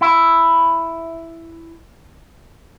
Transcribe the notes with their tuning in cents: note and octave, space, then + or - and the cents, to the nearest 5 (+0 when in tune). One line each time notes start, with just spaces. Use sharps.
E4 +5